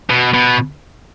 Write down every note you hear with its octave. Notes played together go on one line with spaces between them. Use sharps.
B2
B2